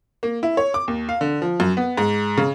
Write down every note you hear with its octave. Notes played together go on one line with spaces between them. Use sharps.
A#3
E4
C#5
D6
D#2
F5
D3
F3
F#2
B3
G#2
C#3